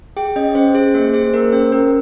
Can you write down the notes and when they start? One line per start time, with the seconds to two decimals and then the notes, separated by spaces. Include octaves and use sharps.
0.17 G#4 G5
0.36 C#4 D#5
0.55 C#4 C5
0.75 G#4 C5
0.94 A#3 C5
1.14 G#4 C5
1.33 A#3 A#4
1.52 C#4 C5
1.72 C#4 A#4